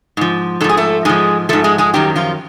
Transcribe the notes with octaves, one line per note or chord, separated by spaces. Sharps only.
G#2 F3
G#2 F3 A4
G#4
A3 A4
G#2 F3 G#3 G#4
G#2 F3 A3 A4
G#3 G#4
G#3 G#4
F#2 D#3 F#3 G3 G4
F3 F4